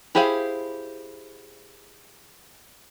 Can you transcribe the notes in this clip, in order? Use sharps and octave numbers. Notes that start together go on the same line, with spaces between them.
E4 G4 G#4 C5 F5